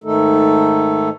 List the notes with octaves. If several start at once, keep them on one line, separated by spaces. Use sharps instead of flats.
G#2 D#3 A3 D#4 A4